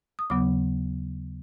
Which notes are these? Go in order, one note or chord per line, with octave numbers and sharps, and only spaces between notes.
D#6
D#2 C#3 F#3 B3 D6